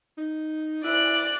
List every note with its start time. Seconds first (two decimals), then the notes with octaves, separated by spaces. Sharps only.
0.18 D#4
0.84 E4 D5 F#6